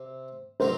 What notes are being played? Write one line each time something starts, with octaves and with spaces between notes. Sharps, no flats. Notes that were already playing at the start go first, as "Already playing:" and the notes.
Already playing: C3 C4
C3 F#3 C5